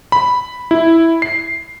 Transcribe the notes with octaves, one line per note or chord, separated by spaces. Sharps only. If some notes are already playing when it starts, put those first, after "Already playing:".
B5
E4
C7